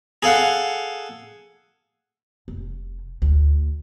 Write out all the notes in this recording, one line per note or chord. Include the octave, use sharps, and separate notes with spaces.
G#4 A4 F5 F#5
F1
D2